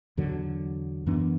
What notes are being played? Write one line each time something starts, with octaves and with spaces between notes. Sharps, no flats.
E2 D3 F#3
F#2 E3 B3 D4